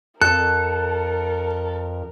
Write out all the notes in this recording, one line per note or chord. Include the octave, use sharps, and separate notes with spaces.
F2 A4 A#4 F#6